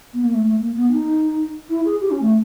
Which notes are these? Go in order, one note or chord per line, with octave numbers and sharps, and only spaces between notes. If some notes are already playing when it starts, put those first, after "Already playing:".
B3
A#3
A3
A3
A#3
B3
D#4
E4
G#4
G4
C#4
A3